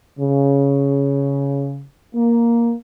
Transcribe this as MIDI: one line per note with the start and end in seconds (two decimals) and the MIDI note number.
0.19 1.83 49
2.14 2.74 58